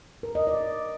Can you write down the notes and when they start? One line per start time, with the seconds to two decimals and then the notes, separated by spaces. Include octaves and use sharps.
0.23 A#4
0.35 D#5
0.47 D5